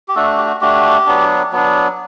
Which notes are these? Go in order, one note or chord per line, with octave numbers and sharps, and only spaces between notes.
G4
A3 D4 F#4 A4
G4
F#4
A3 D4 F#4 G4
F#3 B3 D4
F#3 B3 D4